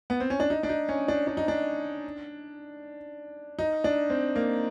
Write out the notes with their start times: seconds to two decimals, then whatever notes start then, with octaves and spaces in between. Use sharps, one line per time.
0.10 B3
0.20 C4
0.30 C#4
0.40 D4
0.50 D#4
0.63 D4
0.69 D#4
0.89 C#4
1.08 D4
1.27 D4
1.37 D#4
1.48 D4
3.59 D#4
3.84 D4
4.10 C4
4.36 A#3